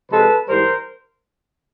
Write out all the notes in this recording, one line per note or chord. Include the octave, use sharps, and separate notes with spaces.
C3 F3 G#3 A4 B4
G#2 E3 G3 A#4 C5